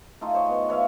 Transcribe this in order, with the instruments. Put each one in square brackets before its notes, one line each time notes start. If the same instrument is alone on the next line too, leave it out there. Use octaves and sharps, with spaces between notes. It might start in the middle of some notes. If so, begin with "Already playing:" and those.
[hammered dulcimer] A3 D#4 F4 G#4
C5 C#5 D#5
B3
B4 C#5 E5 F5